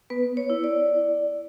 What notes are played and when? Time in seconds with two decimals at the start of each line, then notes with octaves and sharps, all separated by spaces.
0.10 B3 B4
0.37 C#5
0.50 E4
0.64 D5